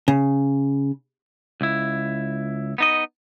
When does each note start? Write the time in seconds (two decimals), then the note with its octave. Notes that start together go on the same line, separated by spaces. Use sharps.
0.08 C#3
1.61 C#2 E4
2.78 B3 D#4 D#5